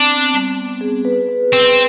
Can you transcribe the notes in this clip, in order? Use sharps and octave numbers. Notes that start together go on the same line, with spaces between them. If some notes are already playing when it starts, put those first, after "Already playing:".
Already playing: C4 D4
B3
G3
B3
G#4
B4
B4
C4 B4